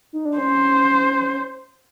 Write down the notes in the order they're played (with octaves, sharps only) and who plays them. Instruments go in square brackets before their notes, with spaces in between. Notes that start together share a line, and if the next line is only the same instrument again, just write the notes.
[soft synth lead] D#4
D4
[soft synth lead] C#4 [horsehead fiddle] C5